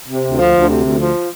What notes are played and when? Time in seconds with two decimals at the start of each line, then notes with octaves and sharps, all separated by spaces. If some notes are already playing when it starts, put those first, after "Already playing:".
0.08 C3
0.24 D2
0.38 F3
0.54 D2
0.69 C3
0.84 D2
0.99 F3